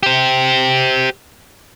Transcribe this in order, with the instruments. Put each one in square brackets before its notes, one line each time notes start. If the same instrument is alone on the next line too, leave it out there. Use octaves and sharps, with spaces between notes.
[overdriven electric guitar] G4 C5